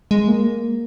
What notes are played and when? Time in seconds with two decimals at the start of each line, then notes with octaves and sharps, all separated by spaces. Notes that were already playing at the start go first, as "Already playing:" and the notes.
0.11 G#3
0.28 A#3